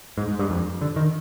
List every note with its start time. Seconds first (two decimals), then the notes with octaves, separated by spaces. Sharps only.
0.18 G#2
0.28 G#2
0.39 G2
0.50 F2
0.81 D3
0.96 D#3